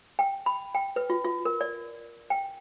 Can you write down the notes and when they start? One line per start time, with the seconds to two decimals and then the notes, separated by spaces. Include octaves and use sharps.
0.19 G5
0.46 B5
0.75 G5
0.96 B4
1.10 F4
1.25 F4
1.45 A#4
1.61 D5
2.30 G5